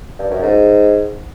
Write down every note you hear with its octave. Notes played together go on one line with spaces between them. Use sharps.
G2
F#2
G#2